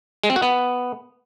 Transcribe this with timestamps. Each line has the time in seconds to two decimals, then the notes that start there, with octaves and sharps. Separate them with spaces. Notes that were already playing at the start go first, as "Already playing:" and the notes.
0.24 G#3
0.30 C4
0.36 F#4
0.42 B3